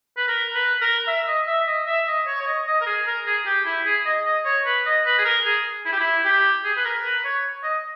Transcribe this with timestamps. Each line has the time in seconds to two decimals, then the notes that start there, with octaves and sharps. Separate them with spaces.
0.17 B4
0.28 A#4
0.55 B4
0.81 A#4
1.07 E5
1.27 D#5
1.47 E5
1.67 D#5
1.87 E5
2.07 D#5
2.27 C#5
2.41 C#5
2.47 D#5
2.67 D#5
2.81 A#4
2.87 G#4
3.07 A#4
3.26 G#4
3.46 G4
3.66 E4
3.85 G#4
4.06 D#5
4.25 D#5
4.46 C#5
4.66 B4
4.86 D#5
5.06 B4
5.18 G#4
5.25 A#4
5.45 G#4
5.86 E4
5.93 G4
6.00 E4
6.25 G4
6.65 G#4
6.77 B4
6.85 A#4
7.05 B4
7.25 C#5
7.64 D#5